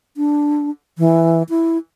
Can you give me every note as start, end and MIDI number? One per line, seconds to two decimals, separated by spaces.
0.17 0.70 62
0.98 1.43 52
1.49 1.78 64